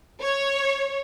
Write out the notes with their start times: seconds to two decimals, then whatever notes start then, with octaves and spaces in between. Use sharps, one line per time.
0.21 C#5